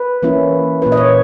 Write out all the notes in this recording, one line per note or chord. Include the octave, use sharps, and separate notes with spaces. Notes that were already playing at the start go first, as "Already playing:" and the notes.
Already playing: B4
E3 A#3 C#4 E4
A#2 A#3 E4 B4
D#5
C#5